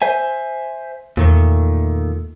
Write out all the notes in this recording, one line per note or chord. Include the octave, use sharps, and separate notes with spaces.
C5 E5 G#5
E2 A#2 D#3 A3